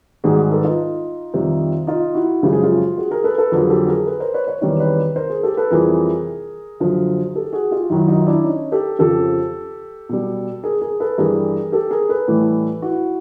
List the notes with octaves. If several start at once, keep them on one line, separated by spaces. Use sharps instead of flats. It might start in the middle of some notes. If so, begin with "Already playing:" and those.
G#2 D#3 G3 F#4 G#4
A4 B4
D#4 F4
F2 C3 D#3 G3
D#4 F4
E4 F#4
F#2 C#3 F3 G#3 G4
G#4
F4 G4
F#4 G#4
G#4 A#4
A4 B4
A4 B4
F2 D3 F#3 G#4 A#4
G4 A4
G#4 A#4
A4 B4
A#4 C5
B4 C#5
B4 C#5
E2 C3 D#3 G3 B4 C#5
B4 C#5
A#4 C5
G#4 A#4
G4 A4
A4 B4
F2 C3 E3 G3 G#4 A#4
F#2 D3 F3
G4 A4
F#4 G#4
F4 G4
F#2 D#3 F#3 E4 F#4
D#4 F4
D4 E4
C#4 D#4
G4 A4
F2 C#3 F3 G4 A4
B2 G3
G#4 A#4
G#4 A#4
A4 B4
G2 E3 G3 G#4 A#4
G4 A4
G#4 A#4
A4 B4
A2 E3 G3
E4 F#4